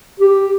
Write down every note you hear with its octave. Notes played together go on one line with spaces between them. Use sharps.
G4